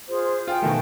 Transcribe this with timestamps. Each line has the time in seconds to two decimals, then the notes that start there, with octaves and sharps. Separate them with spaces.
0.08 F4 G#4 C5
0.48 F4 G5 G#5
0.62 B2 D#3 A3